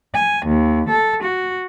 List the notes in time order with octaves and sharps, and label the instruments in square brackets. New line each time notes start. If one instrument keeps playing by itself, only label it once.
[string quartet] G#5
D#2
A4
F#4